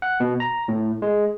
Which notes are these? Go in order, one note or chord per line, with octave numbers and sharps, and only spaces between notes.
F#5
B2
A#5
A2
G#3